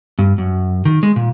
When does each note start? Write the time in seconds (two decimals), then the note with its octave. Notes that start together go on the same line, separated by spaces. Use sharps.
0.19 G2
0.38 F#2
0.85 D#3
1.03 G#3
1.16 A#2